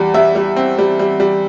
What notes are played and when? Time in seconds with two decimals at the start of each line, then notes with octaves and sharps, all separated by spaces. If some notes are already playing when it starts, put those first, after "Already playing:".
Already playing: E2 G3
0.14 G3 E5
0.35 G3
0.57 C4
0.78 G3
0.99 G3
1.20 G3